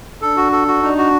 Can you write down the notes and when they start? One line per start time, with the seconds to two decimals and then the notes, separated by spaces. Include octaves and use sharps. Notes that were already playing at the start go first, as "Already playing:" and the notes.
0.22 D4 A4
0.37 F#4
0.52 A4
0.68 F#4
0.82 D4 D#4
0.98 F#4